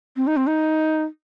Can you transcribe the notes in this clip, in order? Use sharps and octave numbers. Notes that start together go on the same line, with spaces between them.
C4
D#4
C4
D#4